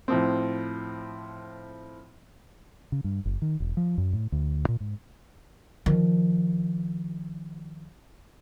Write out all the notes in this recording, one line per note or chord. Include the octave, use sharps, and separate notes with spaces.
A2 F3 C4
C#3
G2
F#1
D#3
E1
F3
F#2
A2
D2
A#2
G#2
D#3 F3